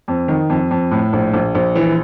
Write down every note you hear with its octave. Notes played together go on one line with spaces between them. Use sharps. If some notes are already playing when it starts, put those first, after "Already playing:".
F2
D#3
F2
F2
A2
A#1
A#1
A#1
E3